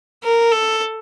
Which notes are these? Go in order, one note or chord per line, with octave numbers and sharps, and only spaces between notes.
A#4
A4